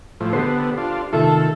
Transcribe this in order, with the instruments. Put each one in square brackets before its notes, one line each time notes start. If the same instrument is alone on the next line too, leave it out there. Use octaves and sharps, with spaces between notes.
[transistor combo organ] A2 F3
[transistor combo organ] D3 B3 [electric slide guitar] G4 A4 C5
[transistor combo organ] D4 F4
[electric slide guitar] C3 D#3 F4 [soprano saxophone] A3 [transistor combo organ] A4